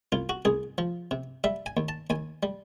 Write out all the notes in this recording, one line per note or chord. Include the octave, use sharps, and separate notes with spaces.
C2 F4
F#4
C2 G#4
F3
C3
G3 E5
G#5
D#2
A5
D#2 G#5
G3